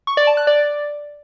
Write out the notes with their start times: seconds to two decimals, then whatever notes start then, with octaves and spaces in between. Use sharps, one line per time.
0.07 C#6
0.17 D5
0.27 A5
0.37 F#6
0.47 D5